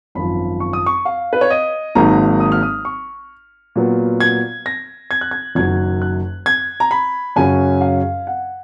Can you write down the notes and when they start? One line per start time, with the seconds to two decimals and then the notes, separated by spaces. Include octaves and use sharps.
0.15 G#1 F#2 F3 B5
0.60 C#6
0.73 D#6
0.86 C#6
1.05 F5
1.33 B4
1.41 C#5
1.50 D#5
1.95 G#1 G#2 F#3 A#3 D#4 A#5
2.40 D#6
2.52 F6
2.62 D#6
2.85 C#6
3.76 A#2 F#3 B3
4.20 G#6
4.66 A#6
5.11 G#6
5.21 F#6
5.31 G#6
5.55 F#1 F#2 D#3 F#3 G#6
6.02 F#6
6.46 G#6
6.80 A#5
6.91 B5
7.36 F#2 C#3 F#3 C#4 G#5
7.81 F5
8.27 F#5